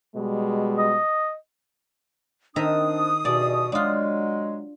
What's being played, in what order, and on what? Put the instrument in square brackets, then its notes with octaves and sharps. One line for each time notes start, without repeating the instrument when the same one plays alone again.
[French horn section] B2 G3 G#3
[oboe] D#5
[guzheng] D#3 E5 A#5 [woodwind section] C4 D4 [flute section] D#6
[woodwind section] E2 G2 B2 [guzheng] D5
[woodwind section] F#3 G#3 [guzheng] D4 F4